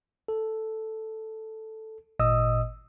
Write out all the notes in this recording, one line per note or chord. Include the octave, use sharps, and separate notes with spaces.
A4
G#1 A#2 D#5 D#6 E6